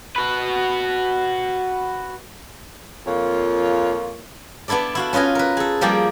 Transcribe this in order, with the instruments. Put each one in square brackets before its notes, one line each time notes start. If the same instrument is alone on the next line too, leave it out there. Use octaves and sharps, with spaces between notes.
[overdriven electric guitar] F#4 B4
[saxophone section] F2 A#3 F4 C#5
[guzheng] B3 D4 E4 A4 D5
E4 F#4 F5
C#4 F4 B4 D#5 G#5
A#4 B4
G#4 A4
F3 G3 A#3 G4 G#4 D5